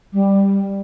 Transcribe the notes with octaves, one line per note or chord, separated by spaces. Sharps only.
G3